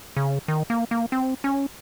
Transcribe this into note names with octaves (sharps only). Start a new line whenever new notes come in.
C#3
D#3
A#3
A#3
C4
C#4